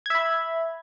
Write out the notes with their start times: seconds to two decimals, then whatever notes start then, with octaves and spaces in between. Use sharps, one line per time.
0.06 G#6
0.10 E5
0.15 B5